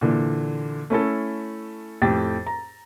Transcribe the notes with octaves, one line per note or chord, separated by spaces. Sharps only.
A#2 D3 E3
A3 C#4 E4 A4
F2 A2 G4 G5 A6
A#5